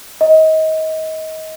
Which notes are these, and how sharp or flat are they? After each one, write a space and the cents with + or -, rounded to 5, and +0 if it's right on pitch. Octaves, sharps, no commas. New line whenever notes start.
D#5 +25